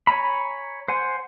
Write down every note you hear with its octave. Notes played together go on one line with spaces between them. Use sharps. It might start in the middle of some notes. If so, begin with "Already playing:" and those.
C#5 G#5 A#5 B5
C5 F#5 G#5